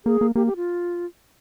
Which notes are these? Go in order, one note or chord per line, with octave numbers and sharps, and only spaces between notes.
A#3 G#4
A#3
A#3 G4
G4
F4